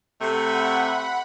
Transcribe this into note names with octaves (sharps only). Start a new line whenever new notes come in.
C3 A3 F#5 B5